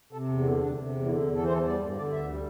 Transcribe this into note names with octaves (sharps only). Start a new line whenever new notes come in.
C3 A4
E2
D3 C4
D2 D4
C3
E2
D3 E4
E2 C4
E3 A4
C5
E2 A4
G3 D5
G2
D3 D5
D2 E5
G3